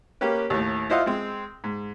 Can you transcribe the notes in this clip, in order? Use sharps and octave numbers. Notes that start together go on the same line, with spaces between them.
A#3 C#4 G4 B4
D#2 A2
E4 F4 C5 D#5 F5 F#5
G#3 C4
G#2